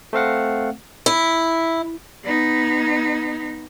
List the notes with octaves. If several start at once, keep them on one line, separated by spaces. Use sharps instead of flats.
A3 C4 F5 F#5
E4
B3 D#4